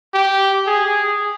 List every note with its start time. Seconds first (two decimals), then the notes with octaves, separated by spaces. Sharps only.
0.14 G4
0.67 G#4